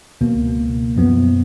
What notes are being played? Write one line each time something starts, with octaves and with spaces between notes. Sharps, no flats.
C#2 B2 A#3
F#2 F3 B3